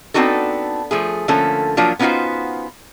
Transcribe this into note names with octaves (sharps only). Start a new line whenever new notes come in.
B3 C4 D4 D#4 F#4 A4
F3 A3 G#4
D3 F3 A3 A#3 C#4 A4
F3 F#3 A#3 D4 F4
B3 C#4 D#4 F4 F#4 C5